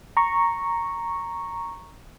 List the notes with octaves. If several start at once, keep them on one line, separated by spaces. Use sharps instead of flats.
A#5 C#6